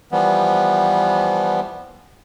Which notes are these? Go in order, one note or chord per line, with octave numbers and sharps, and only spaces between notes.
E3 F3 G3 B3